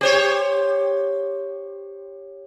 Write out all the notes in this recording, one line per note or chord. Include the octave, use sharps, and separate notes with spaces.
G4 C5 C#5